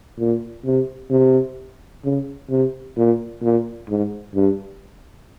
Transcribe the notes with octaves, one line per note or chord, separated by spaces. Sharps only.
A#2
C3
C3
C#3
C3
A#2
A#2
G#2
G2